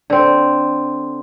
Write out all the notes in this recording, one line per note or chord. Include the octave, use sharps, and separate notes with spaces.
D3 C4